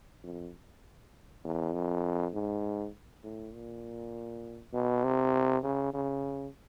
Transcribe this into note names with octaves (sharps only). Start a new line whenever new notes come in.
F2
E2
F2
G#2
A2
A#2
B2
C3
C#3
C#3